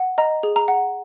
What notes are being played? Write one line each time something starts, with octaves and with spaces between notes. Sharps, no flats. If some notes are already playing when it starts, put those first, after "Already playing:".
Already playing: F#5
D#5 A#5
G#4
A#5
F#5